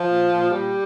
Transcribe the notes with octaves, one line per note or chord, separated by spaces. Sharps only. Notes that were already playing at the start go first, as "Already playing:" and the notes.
Already playing: F3
A#2
A#2
A#2 G3